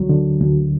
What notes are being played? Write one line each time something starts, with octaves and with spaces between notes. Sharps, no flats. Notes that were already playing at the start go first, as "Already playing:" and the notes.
Already playing: D2 F#3
D3
D2